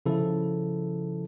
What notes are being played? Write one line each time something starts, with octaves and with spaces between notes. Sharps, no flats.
C#3 F3 E4 A4